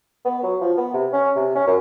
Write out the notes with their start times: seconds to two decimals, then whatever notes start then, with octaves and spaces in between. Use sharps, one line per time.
0.25 B3
0.43 F#3
0.61 F3
0.77 B3
0.94 C3
1.13 C#4
1.36 C3
1.55 C#4
1.67 F#2